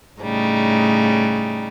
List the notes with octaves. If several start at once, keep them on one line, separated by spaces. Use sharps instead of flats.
A2 C#3 G3 D#4